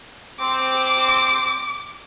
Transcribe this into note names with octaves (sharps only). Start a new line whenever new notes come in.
C4 D6